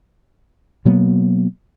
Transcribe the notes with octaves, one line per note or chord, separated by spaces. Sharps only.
B2 F#3 A#3 B3